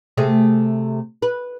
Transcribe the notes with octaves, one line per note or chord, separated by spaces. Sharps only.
C3 A3 G#4
B4